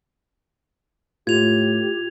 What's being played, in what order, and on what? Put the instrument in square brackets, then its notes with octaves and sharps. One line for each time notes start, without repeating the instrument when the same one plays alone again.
[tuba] A2 [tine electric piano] F4 [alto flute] G4 [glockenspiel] G#6 F7